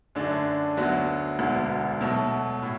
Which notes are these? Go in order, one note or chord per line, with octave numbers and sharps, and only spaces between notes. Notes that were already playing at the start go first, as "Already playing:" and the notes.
F#2 D3 A3 D4
D2 D3 F#3 B3 F#4
E1 D2 D3 B3
B2 F#3 A3
A2